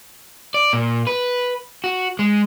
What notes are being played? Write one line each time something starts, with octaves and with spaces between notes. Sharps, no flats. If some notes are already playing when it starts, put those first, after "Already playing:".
D5
A#2
B4
F#4
G#3